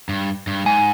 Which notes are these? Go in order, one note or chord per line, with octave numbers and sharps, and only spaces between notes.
G2
G2
G#2 G#5